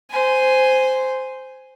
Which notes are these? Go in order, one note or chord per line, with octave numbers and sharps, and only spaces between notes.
C5 G#5